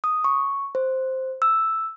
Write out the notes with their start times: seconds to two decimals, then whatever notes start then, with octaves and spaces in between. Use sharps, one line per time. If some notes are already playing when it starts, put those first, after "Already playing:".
0.04 D#6
0.24 C#6
0.75 C5
1.42 E6